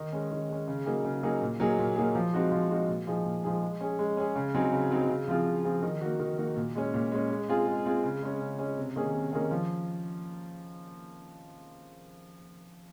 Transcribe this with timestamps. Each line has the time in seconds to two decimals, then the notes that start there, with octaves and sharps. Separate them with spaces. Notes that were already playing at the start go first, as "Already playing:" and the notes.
Already playing: D#3
0.13 G#3 C#4
0.31 D#3
0.49 G#3 C#4
0.68 C#3
0.86 F#3 A#3 D#4 G#4
1.04 C#3
1.23 F#3 A#3 D#4 G#4
1.42 A#2
1.60 F#3 A#3 D#4 G#4
1.78 A#2
1.96 F#3 A#3 D#4 G#4
2.15 F3
2.34 G#3 C4 D#4 F#4
2.52 F3
2.70 G#3 C4 D#4 F#4
2.88 A#2
3.07 F3 G#3 D#4 G#4
3.25 A#2
3.44 F3 G#3 D#4 G#4
3.62 G#3
3.81 C#4 G#4
3.99 G#3
4.17 C#4 G#4
4.35 C#3
4.54 F#3 C4 D#4 G#4
4.72 C#3
4.91 F#3 C4 D#4 G#4
5.09 C#3
5.28 F3 C4 F4 G#4
5.47 C#3
5.65 F3 C4 F4 G#4
5.83 D#3
6.01 A#3 D#4 F#4
6.20 D#3
6.38 A#3 D#4 F#4
6.56 A#2
6.75 G#3 C#4
6.94 A#2
7.12 G#3 C#4
7.30 G#3
7.49 C4 F4 G#4
7.66 G#3
7.86 C4 F4 G#4
8.04 C#3
8.23 G#3 C#4
8.41 C#3
8.59 G#3 C#4
8.78 C3
8.96 D#3 A#3 C#4 G#4
9.14 C3
9.33 D#3 A#3 C#4 G#4
9.51 F3